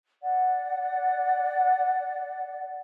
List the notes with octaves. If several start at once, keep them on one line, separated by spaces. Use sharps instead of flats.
D5 F#5